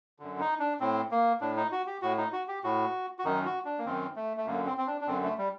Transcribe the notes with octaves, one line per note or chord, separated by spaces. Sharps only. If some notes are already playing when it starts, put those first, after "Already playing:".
F#2 D3
D#4
D4
A2 C4
A#3
A2 D4
D#4
F#4
G4
A2 F#4
D#4
F#4
G4
A2 F#4
F#4
F#2 D#3 D#4
F#4
D4
A#3
F#2 D#3 C4
A3
A3
F#2 D3 A#3
C4
C4
D4
D4
F#2 D3 C4
A3
G3